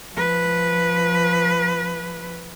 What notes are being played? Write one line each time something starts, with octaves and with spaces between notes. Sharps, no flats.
F3 B4